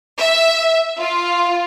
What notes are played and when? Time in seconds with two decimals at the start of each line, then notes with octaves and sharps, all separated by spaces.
0.19 E5
1.00 F4